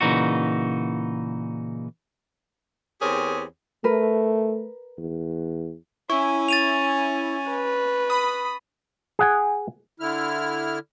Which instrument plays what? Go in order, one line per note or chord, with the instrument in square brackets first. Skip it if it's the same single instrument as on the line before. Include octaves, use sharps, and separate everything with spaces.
[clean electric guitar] A#2 C#3 E3 D#4 F#4
[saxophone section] E2 C4 G4 G#4 A#4 C#5
[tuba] A3 [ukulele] A#4 B4
[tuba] E2
[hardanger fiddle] C#4 G#5 [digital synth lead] E4 [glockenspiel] C#6
[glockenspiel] A6 D#7 F7
[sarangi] B4
[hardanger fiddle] B5 [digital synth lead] D#6
[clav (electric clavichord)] G#4 F#5 G#5
[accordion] D3 E4 F6